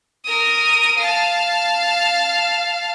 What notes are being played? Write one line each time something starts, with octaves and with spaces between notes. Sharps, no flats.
A#4 D#6
F5 A5